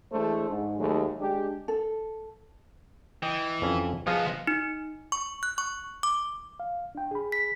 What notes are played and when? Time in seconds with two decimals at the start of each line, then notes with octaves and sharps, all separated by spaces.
0.12 E3 G#3 A3 D4 C5
0.50 G#2
0.79 D#2 F#3 G#3 A3
1.19 G#3 D4 G4
1.68 A4
3.23 E3 D#5 G5
3.62 F2 C#4
4.07 F3 B3 D#4 G#4 F5
4.47 D#4
5.12 C#6
5.43 F#6
5.58 C#6
6.03 D6
6.60 F5
6.95 D4 G5
7.11 G#4 B5
7.32 B6